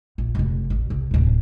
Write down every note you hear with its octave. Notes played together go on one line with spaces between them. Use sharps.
A#1
F1 F2
A1
C2
D1 C3